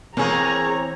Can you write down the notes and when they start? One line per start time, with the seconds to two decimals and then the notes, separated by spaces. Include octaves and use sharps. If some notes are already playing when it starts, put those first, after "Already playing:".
0.17 E3 A#3 C4 C#4 G#4 C#5 A#5